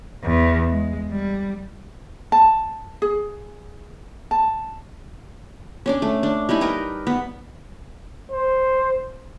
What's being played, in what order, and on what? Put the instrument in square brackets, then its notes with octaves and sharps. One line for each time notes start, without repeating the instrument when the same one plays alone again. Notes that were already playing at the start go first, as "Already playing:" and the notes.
[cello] E2
G#3
G3
[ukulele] A5
G#4
A5
[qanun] C#4 D4 D5
A3
D4
G3 D#4 E4 G#5
A#4 B4 D#5 G5
B3
[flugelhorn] C5